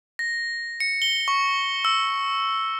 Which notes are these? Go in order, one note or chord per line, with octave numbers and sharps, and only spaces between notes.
A#6
C#7
G7
C#6
E6